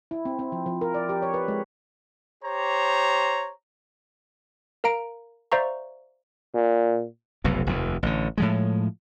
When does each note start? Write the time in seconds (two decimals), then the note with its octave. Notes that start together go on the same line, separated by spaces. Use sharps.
0.11 E4
0.25 C4
0.39 C4
0.52 F3
0.66 F3
0.81 A#4
0.94 D5
1.09 G4
1.22 C#5
1.34 B4
1.48 G#3
2.44 G4 C5 C#5 A#5
4.84 A#4 F5 A#5 D7
5.52 C5 D5 E5 F5 A#5 C#6
6.54 A#2
7.44 F1 B1 F2
7.67 F1 D#2
8.03 A1 D3
8.38 A2 F3 G#3